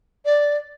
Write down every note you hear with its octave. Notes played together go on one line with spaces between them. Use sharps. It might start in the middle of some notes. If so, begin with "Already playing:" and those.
D5